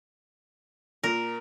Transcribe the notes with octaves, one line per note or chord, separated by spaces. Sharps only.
A#2 A#4